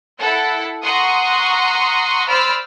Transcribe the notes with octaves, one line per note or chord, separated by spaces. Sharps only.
E4 A4 F#5
F#5 A#5 C6 C#6 D#6
C5 D5 B5 E6 F6